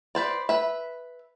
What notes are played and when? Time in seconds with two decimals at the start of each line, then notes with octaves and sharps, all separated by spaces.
0.15 B4 C5 D5
0.49 B4 E5